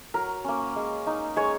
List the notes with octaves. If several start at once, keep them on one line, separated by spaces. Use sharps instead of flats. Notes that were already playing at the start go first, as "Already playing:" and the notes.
F#3 A#4
A#3 C#4
G#3
D#4
G#3 C#5